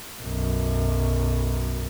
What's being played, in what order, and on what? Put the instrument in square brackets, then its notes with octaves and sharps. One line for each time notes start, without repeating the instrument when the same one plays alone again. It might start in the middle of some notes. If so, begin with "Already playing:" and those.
[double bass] B1 F#2